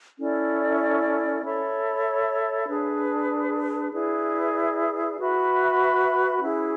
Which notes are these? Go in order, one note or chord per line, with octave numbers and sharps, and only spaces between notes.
C#4 E4 A4 D5
A4 C#5 E5 B5
D4 G#4 B4
E4 G#4 B4 D5
F#4 B4 E5 B5
C#4 E4 G#4